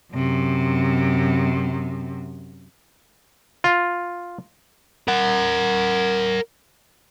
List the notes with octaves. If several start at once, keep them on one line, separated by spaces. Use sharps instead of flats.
F#2 C3
F4
A#4 F#5